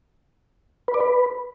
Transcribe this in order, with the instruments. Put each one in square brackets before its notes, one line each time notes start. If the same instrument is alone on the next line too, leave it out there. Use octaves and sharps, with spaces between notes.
[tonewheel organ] B4
D5
B4